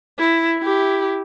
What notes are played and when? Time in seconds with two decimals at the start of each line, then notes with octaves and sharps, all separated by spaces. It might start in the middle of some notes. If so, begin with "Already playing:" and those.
0.19 E4
0.59 E4 G4